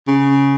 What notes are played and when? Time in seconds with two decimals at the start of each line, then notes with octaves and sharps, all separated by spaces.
0.08 C#3